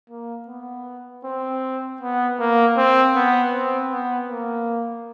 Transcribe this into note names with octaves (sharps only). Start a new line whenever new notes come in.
A#3
B3
C4
B3
A#3
C4
B3
C4
B3
A#3